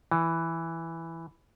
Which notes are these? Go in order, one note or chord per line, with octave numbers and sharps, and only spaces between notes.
E3